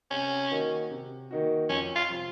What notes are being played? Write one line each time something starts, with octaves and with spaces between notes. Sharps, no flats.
C3 C#4
D#3 A#3 D#4 F#4
C3
D#3 A#3 D#4 F#4
F2 C#4
F4
C3 F3